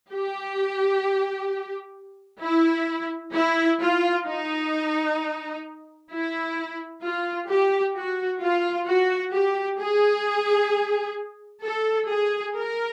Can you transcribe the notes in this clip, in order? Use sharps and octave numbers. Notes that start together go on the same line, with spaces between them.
G4
E4
E4
F4
D#4
E4
F4
G4
F#4
F4
F#4
G4
G#4
A4
G#4
A#4